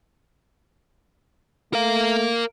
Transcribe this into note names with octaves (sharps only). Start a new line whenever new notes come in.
A3 A#4 F5